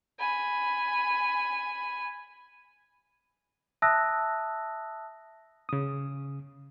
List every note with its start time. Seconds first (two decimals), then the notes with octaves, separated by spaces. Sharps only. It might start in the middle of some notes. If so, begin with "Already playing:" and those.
0.19 G#5 B5
3.82 E5 A5 D#6 E6 F#6 A#6
5.69 C#3 D#6